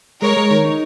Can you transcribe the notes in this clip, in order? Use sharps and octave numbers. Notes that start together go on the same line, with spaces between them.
G#3 A#4 C#5
G#3
D#3
D#4